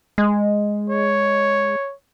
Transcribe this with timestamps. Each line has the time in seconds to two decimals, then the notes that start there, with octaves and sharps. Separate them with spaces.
0.18 G#3
0.90 C#5